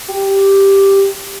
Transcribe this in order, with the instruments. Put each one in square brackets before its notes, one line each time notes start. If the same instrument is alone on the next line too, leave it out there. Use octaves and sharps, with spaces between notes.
[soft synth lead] G4